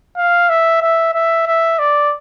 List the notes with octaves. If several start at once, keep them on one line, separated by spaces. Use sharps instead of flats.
F5
E5
E5
E5
E5
D5